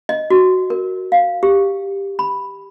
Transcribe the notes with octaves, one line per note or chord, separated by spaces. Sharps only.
D#5
F#4
A#4
F5
G4
B5